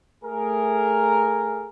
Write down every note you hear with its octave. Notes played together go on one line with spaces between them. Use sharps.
A3 G#4 A#4